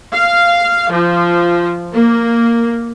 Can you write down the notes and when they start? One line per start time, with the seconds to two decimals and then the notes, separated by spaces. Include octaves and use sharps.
0.13 F5
0.92 F3
1.94 A#3